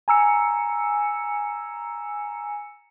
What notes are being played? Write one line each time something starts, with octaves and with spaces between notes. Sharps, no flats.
G#5 A#5 E6 C#7